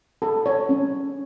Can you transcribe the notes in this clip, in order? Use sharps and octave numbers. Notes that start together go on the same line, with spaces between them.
A4
C#5
C#4